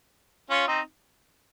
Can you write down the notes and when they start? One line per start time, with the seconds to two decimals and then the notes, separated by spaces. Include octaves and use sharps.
0.50 C#4 F4
0.67 C4 D#4